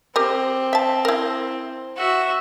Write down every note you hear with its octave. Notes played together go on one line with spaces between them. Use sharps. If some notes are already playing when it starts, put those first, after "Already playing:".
C4 G4 A#4
E5 A5
E4 A#4
F#4 E5